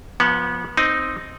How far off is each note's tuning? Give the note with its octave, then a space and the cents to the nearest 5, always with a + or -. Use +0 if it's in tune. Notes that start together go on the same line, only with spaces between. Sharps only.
F3 +0 B3 -30 F#5 +0
C4 +0 D#4 +0